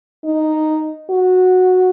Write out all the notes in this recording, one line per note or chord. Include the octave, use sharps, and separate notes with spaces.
D#4
F#4